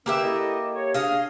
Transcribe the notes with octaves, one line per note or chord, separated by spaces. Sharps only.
D3 A#3 C#4 G4 B4 E5
E4 A4 D#5
C#5
D4 G#4 D#5 F5